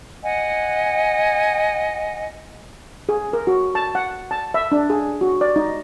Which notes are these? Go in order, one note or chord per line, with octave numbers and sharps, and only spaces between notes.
D#5 F#5 G#5
G#4
A#4
F#4
A5
F#5
A5
E5
D4
G#4
F#4
D5
D#4